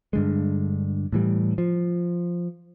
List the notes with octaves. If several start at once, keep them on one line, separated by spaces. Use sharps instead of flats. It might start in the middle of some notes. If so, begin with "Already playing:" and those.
G2 D3 G#3
A2 E3 G3
F3